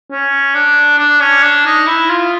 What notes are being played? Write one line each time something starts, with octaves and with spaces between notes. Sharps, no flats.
C#4
D4
D4
C#4
D4
D#4
E4
F4